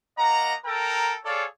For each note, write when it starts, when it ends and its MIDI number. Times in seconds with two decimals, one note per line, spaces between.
0.18 0.54 58
0.18 0.54 75
0.18 0.54 78
0.18 0.54 82
0.65 1.15 69
0.65 1.15 70
0.65 1.15 79
0.65 1.15 82
1.25 1.44 68
1.25 1.44 69
1.25 1.44 73
1.25 1.44 74
1.25 1.44 77